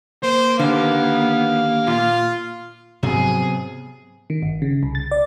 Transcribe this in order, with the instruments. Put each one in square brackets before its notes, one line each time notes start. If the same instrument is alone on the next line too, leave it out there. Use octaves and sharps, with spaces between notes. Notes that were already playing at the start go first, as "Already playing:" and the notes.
[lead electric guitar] A#3 [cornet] C5
[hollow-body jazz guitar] D#2 D3 [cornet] B3 [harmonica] F5
[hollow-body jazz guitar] A#2 [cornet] F4
[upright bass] G#2 F3 [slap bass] C3 B3 [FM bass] F#3 [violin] G#4
[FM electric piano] D#3
G1
C#3
C2
A6
D5